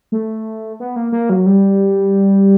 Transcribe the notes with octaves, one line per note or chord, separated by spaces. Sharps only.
A3
B3
A#3
A#3
F#3
G3